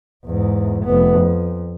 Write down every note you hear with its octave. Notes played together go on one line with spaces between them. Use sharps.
E2 G#2
F1 B3
F2